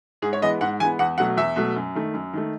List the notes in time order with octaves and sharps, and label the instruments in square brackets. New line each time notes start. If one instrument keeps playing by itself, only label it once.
[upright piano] G#2 G#4
C#5
E3 G#3 B3 D#5
G#2 F#5
E3 G#3 B3 G#5
E2 F#5
B2 F#3 A3 F#5
E2 E5
B2 F#3 A3
F#2
D#3 A3
F#2
D#3 A3